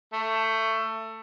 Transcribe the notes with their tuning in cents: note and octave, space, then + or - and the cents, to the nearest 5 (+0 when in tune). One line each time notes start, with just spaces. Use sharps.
A3 +20